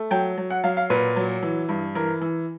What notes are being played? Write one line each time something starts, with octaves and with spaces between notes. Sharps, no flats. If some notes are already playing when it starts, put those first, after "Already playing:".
Already playing: A3
F#3 G5
F#3
F#5
F#3 F5
F5
A#2 B4
F#3
E3
G2
E3 A#4
E3